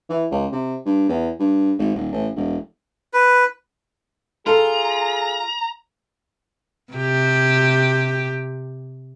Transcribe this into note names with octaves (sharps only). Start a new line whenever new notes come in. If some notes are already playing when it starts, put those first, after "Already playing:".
E3
C#2
C3
G2
E2
G2
G#1
D#1
A1
E1
B4
F4 G#4 A4 A#5
C3 G4